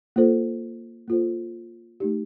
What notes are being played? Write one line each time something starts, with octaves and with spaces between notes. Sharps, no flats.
A#3 F4 A4 C5
A#3 F4 A4 C5
A3 D#4 G4